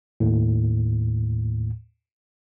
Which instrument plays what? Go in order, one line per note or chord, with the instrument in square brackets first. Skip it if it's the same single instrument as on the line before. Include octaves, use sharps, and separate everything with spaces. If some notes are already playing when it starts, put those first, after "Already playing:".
[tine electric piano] D#2 A2